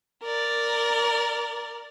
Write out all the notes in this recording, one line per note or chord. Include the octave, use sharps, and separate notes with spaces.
A#4 D5